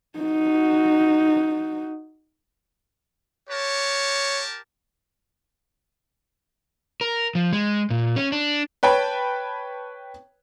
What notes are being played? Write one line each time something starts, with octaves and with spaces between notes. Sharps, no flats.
D#4 F#4
G4 A#4 C#5 A5
A#4
F3
G#3
A#2
C#4
D4
B4 C#5 G5 A5 B5